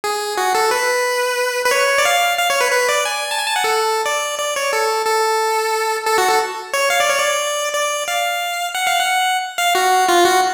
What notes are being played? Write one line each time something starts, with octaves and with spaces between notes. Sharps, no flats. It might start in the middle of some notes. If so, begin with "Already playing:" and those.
G#4
F#4
A4
B4
B4
C#5
D5
F5
F5
C#5
B4
B4
D5
G#5
A5
G#5
A5
F#5
A4
D5
D5
C#5
A4
A4
A4
F#4
A4
C#5
F5
D5
C#5
D5
D5
F5
F#5
F5
F#5
F5
F#4
F4
F#4